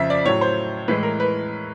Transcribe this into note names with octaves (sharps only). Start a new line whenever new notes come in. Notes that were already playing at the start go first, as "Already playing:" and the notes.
Already playing: F2 C#3 F3 E5
D5
A2 F#3 C#5
C5
A2 E3 G#3 B4
A#4
B4